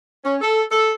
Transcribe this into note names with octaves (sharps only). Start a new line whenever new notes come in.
C#4
A4
A4